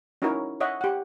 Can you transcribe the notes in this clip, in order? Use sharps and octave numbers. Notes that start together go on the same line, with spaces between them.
C#4 D#4 E4 F#4 A#4 C#5
C#5 D#5 E5 F#5
G4 F#5